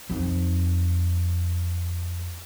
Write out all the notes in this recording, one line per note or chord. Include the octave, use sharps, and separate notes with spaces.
F2 D#4